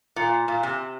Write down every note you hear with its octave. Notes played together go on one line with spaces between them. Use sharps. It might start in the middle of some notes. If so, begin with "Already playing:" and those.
A#2
A#2
C3